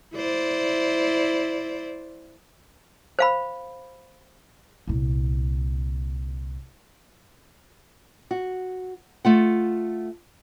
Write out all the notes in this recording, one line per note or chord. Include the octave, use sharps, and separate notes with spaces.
E4 C5 D5
C5 F5 B5
C2 A#2
F#4
A3 F4 F#5